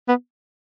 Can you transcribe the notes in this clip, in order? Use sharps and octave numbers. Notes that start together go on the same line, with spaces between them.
B3